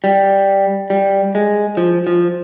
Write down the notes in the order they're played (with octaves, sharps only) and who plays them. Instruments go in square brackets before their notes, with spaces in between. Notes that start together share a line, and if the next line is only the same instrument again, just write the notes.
[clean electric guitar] G3
G3
G#3
F3
F3